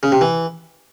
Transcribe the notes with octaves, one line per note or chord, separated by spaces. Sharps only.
C#3
C3
E3